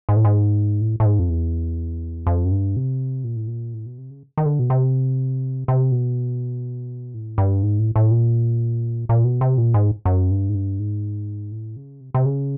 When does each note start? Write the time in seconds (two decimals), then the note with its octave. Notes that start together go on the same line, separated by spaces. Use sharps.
0.09 G#2
0.16 A2
0.25 G#2
0.81 A2
1.00 A2
1.05 G#2
1.19 F2
1.30 E2
2.27 F2
2.45 F#2
2.51 G2
2.76 C3
3.24 A#2
3.36 A2
3.47 A#2
3.74 A2
3.86 B2
3.98 C3
4.10 C#3
4.38 D#3
4.46 D3
4.59 B2
4.70 C3
5.68 C3
5.92 B2
7.14 A2
7.38 G2
7.63 G#2
7.79 A2
7.96 A2
8.11 A#2
9.09 A#2
9.24 B2
9.41 C3
9.58 A#2
9.74 G#2
10.05 F#2
10.31 G2
10.49 G#2
10.55 G2
10.79 G#2
11.52 A2
11.76 C#3
12.00 C3
12.14 C3
12.25 C#3